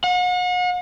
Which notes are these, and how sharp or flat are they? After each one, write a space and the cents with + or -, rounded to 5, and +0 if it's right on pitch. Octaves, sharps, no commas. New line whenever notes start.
F#5 -40